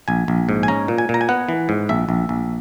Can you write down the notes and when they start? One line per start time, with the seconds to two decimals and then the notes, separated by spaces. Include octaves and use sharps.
0.08 A#1 G#5
0.28 A#1
0.49 G#2
0.63 G#5
0.68 C#4 A#5
0.88 A#2
0.98 G#5
1.09 A#2
1.14 A#5
1.21 G#5
1.29 B3 F#5
1.49 E3
1.69 G#2
1.89 A#1 E5
2.09 A#1
2.29 A#1